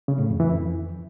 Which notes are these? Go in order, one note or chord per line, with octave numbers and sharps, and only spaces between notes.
C#3
A2
F2
E3
F2